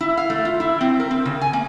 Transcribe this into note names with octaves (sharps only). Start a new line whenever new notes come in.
E4
F5
A3
F4
E4
C4
A#4
C4
C#3
G#5
A#3